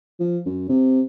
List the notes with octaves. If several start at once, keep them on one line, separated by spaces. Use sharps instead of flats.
F3
F#2
C3